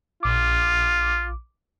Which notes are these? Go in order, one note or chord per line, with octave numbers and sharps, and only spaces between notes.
A#1 F4 D6